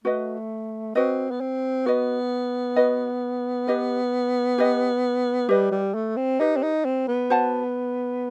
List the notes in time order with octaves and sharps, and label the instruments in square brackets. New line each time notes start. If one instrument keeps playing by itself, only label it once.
[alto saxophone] A3 [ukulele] F#4 B4 D#5
[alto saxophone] C4 [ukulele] F#4 B4 D#5
[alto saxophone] B3
C4
[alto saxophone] B3 [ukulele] F#4 B4 D#5
[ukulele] F#4 B4 D#5
G4 B4 D#5
G4 B4 D#5
[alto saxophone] G3 [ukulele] G4 B4 D#5
[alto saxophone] G3
A3
C4
[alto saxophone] D#4 [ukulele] G4 B4 D#5
[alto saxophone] C4
D#4
C4
B3
[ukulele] F#4 C5 F#5 A5